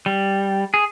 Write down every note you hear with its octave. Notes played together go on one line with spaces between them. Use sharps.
G3
G#4